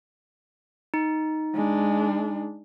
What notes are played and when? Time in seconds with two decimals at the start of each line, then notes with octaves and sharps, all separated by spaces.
0.94 D#4
1.54 G#3 D4